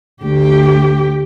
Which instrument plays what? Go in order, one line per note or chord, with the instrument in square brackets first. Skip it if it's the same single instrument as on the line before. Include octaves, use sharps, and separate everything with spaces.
[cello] D2 G4